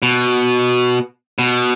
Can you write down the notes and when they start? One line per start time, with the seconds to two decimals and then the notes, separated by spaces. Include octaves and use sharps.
0.02 B2
1.39 B2